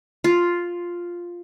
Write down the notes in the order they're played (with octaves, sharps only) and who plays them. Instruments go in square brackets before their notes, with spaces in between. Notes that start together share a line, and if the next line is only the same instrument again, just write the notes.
[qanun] F4